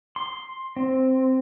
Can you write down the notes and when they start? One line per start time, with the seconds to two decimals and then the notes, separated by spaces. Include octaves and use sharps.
0.16 C6
0.76 C4